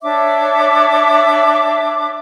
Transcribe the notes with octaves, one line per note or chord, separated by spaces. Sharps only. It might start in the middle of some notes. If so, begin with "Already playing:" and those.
D4 C#5 E5 D6